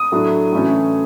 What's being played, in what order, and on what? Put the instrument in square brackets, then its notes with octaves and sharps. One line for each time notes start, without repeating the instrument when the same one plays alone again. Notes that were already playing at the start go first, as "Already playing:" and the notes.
Already playing: [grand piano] D#6
A2 F#3 A3 D4
A2 E3 A3 C#4